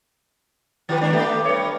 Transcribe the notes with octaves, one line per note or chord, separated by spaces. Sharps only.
D#3 G4 B4
G#2 D4
A3 B3 G4
G2 C#5